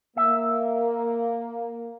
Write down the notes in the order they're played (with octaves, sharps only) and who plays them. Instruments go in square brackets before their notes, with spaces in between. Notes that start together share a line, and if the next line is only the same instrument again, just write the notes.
[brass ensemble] A#3 [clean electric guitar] E5